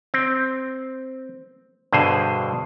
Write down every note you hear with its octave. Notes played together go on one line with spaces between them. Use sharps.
C4
G2 B2 D3 G#4 C5